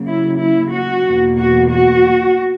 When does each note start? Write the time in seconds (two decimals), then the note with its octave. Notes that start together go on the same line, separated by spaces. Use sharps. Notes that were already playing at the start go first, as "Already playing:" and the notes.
Already playing: C#3 F#3 A#3
0.08 E4
0.40 E4
0.72 F#4
1.05 E2 B2 A#3
1.36 F#4
1.68 F#4